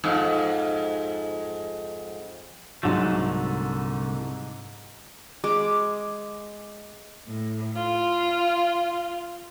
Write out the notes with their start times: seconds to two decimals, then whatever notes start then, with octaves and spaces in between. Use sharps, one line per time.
0.04 F2 G#2
2.83 C2 G#2 D3 F#3 A3
5.44 G#3 D6
7.26 A2
7.76 F4